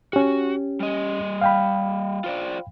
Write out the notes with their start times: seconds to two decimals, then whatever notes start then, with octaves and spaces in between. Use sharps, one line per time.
0.13 C#4 F#4 G4
0.80 G3 D#5
1.41 F5 G5 B5
2.24 F4 C5 D5